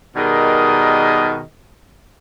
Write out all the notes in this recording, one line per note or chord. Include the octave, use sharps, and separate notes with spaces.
B2 D#3 G3 G#4 A#4 D#5